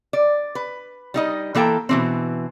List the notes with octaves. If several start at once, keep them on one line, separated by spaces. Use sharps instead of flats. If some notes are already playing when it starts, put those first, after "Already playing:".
D5
B4
G3 D#4 D#5
E3 A#3 A4 G5 A#5
B2 E3 C4